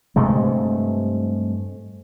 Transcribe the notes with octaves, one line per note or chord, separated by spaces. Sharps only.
G2 C3 G#3 A3